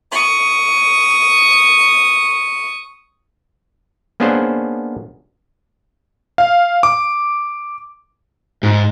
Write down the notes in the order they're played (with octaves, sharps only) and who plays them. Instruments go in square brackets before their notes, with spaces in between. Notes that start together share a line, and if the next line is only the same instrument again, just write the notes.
[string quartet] C#6 D#6
[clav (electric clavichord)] A#3 B3 C#4 D4 G#4 C5
[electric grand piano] F5
D6
[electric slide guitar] G#2